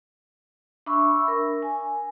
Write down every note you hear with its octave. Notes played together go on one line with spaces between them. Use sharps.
D4 E5 B5 C#6 E6
A#4
G#5